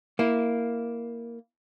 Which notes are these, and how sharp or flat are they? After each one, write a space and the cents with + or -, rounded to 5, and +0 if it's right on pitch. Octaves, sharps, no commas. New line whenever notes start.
A#3 +0 E4 -5